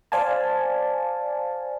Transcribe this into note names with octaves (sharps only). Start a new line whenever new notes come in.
C5 D5 F5 G#5 A5